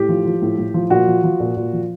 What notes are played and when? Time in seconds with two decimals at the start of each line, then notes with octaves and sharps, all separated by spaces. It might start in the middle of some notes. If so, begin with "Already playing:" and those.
Already playing: A2 G4
0.09 F3
0.25 F3
0.42 A2
0.58 A2
0.74 F3
0.90 A#2 F#4
1.07 F3
1.24 F3
1.40 A#2
1.57 A#2
1.73 F3